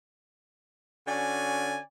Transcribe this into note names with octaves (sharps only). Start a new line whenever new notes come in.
D3 C#4 F#4 D5 G#5